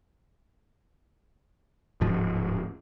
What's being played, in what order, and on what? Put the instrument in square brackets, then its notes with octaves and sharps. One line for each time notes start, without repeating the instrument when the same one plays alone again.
[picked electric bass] D1 G#2 F3